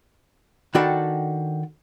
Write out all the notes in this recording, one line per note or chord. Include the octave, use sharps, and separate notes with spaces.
D#3 D4 F#4 A4 G5 B5